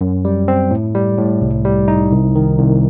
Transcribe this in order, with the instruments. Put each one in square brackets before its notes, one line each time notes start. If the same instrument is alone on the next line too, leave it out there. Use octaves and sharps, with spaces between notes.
[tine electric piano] F#2
G3
C4
A2
G3
A2
C2
G3
D#4
C2
D#3
C2